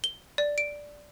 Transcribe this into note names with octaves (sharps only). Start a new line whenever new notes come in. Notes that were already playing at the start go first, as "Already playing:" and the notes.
G7
D5
D7